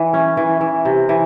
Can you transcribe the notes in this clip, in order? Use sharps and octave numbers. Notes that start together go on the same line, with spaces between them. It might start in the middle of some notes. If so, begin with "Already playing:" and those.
Already playing: E3
C#4
E3
E3
C3
E3